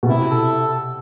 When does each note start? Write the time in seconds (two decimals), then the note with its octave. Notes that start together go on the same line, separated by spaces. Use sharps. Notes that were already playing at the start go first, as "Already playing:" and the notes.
0.03 B2
0.09 C3 E4
0.30 A4